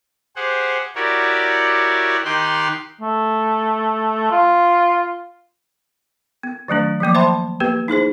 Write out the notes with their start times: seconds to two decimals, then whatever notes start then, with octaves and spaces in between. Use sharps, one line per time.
0.36 G4 G#4 C5 F#5
0.95 E4 F#4 G4 A#4 C#5 D5
2.25 D#3 D#4 G4 G5 C6 F#6
3.01 A3
4.31 F4
6.43 B3
6.68 D#3 F#3 A3 D4
7.00 F3 F#3 A#3 D6
7.15 C5 E5 G5 A5 B5 C6
7.60 A#3 B3 G4 B4
7.88 D#4 E4 G#4 C5